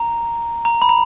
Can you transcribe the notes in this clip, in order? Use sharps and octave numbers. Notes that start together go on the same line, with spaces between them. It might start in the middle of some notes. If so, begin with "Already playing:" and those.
Already playing: A#5
A#5
B5
A#5